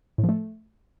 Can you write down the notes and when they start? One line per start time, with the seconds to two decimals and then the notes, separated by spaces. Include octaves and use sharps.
0.18 A2
0.24 F3
0.29 A3